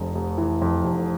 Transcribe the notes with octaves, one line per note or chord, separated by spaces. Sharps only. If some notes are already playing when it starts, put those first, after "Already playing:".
Already playing: F1 F2
F1
E3
F2
F1